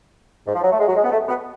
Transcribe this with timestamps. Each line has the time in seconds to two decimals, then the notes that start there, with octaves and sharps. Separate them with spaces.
0.46 G#2
0.55 F3
0.63 F#3
0.72 A3
0.80 G#3
0.88 F#3
0.96 G#3
1.04 B3
1.12 A3
1.28 B3